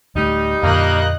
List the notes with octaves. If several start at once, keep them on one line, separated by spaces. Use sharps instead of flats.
D1 D2 G3 A3 D#4
F2 A#2 D3 A#3 D#5 F#6